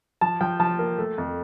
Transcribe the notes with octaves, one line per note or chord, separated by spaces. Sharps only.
F3 A5
F3 G5
F3 A5
A#3
A3
F2